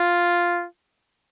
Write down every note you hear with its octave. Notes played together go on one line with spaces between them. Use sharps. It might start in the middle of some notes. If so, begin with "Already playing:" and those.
Already playing: F4